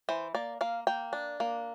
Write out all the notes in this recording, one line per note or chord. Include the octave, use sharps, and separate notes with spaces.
E3 C5
A#3 D5
A#3 F5
A#3 G5
D4
A#3